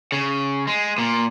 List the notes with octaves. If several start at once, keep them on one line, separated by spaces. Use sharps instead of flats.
C#3
G#3
A#2